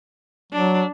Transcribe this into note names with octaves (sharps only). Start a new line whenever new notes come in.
F#3 D4